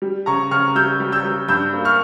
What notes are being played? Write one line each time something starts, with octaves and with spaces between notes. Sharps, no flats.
G3
C#3 A#5 C#6
C#3 C#6 F6
G3 E6 G6
G3
E6 G6
G3
G2 E6 G6
A#3
C#6 F6